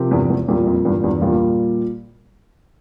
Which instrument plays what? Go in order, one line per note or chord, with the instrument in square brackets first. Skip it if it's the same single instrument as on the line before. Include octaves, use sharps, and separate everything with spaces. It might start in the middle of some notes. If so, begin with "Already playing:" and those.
Already playing: [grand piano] C3 F3 C4 G4 A#4
[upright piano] E2 G2
E2
[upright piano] E2 [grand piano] A#2 G3 A#3 F4
[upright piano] F2
E2 G2
E2 G2
[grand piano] A#2 G3 A#3 F4